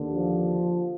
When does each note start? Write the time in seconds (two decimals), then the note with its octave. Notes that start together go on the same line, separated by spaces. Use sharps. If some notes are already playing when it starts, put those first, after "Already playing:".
Already playing: D#2 D3
0.13 F3